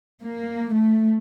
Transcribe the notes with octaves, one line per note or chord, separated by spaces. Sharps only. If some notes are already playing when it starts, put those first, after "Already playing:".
A#3
A3